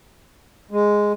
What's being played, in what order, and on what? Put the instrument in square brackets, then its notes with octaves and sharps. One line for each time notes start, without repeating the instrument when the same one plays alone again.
[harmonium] G#3